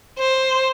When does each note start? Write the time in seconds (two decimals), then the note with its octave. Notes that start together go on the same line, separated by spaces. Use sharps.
0.19 C5